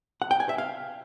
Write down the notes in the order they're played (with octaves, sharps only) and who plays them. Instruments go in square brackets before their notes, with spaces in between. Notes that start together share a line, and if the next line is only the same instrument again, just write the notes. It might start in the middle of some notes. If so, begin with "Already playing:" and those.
[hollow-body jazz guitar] F#5
G5
G#5
E5
F5